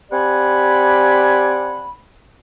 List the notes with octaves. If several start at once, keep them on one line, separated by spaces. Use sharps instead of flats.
C4 G4 D5 F#5 G#5 B5